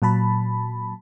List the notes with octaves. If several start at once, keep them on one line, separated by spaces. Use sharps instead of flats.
A#2 F#3 A5 B5